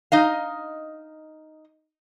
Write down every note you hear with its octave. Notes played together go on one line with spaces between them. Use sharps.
D#4 D#5 F5